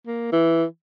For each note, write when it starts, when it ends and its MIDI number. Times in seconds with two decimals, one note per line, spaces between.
0.07 0.30 58
0.32 0.64 52